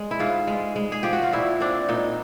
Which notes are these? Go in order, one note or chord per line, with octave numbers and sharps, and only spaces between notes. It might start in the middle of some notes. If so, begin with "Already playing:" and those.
Already playing: G#3
E4
G#2 F4
G#3
G#3
G#4
F3 G4
F#4
F4
A#2 E4
C4 D4
A#2 D#4